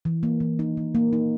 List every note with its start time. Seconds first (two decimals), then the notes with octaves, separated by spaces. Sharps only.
0.05 E3
0.23 A#3
0.40 E3
0.59 D#4
0.77 E3
0.95 A#3
1.13 D#4